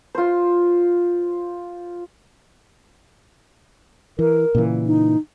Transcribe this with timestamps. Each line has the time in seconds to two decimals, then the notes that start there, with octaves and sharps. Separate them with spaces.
0.15 F4 C5
4.19 E3 A#4
4.55 A#2 C#3 E3
4.86 D#4